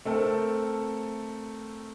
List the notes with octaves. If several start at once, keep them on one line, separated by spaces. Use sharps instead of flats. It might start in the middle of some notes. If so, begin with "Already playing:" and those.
A3 C4 A4 A#4